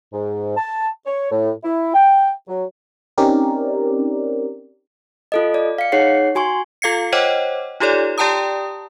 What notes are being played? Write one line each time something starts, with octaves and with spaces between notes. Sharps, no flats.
G#2
A5
C#5
A2
E4
G5
F#3
C4 C#4 D#4 G4 A#4 D5
F4 A4 D#5
D5
F5 C#7
D#4 G#4 C#5 F#5 C7
F#4 G#5 C6 C#6
F4 A4 F5 G#6 C7 C#7
C5 C#5 D#5 F#5 G5 D6
D#4 F4 G4 A4 C#5 D5
G4 D5 G5 A5 A#5 D#6